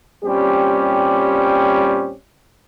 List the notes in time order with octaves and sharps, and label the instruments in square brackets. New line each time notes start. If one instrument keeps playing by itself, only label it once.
[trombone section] A#2 G3 C4 C#4 G4